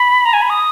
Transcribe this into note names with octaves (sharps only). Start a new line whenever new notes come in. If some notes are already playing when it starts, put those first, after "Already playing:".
Already playing: B5
A#5
G#5
B5
D#6